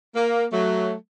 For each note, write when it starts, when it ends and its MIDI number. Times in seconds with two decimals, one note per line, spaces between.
0.15 0.45 58
0.53 0.94 54
0.53 0.94 57